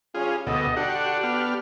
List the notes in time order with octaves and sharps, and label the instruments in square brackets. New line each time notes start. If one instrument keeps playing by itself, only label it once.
[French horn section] C#3 G3 C#4 [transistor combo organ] F4 G#4
[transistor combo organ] D2 B2 A4 [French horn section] G3 B3 D#5
[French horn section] D3 D4 [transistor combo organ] F#4 G4 F#5
[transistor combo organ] B3 G4 F6